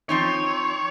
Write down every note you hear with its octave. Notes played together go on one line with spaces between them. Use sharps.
F3 C4 D#4 C#5